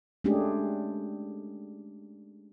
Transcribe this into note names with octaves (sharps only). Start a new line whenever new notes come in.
G#3 A3 C#4 D4 G4 G#4